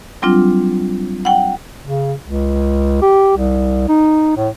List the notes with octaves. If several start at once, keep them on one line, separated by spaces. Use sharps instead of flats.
F#3 G3 C4 D4 F4
F#5 G5
C#3
C#2
G4
C2
D#4
A2